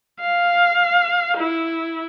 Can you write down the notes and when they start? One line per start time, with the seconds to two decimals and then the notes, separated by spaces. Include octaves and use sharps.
0.20 F5
1.37 E4